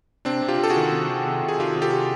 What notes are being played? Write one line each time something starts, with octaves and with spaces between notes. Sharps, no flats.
C3 C4 D4
C3
F4 G4
C3
A4
F#4 G#4
D#3
C3
D#3
C3
C3
G#4
D#3 F4 G4
C3
G4 A4
C3